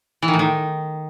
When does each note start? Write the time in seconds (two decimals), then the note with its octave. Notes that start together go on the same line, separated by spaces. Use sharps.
0.22 E3
0.28 D#3
0.34 A2
0.39 D#3